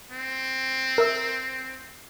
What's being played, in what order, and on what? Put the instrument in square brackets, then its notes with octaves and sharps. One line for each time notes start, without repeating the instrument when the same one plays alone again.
[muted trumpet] C4
[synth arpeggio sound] A#4 E5 E6